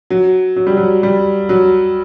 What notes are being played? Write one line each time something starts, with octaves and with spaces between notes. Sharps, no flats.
F#3
F#3
G3
F#3
G3
F#3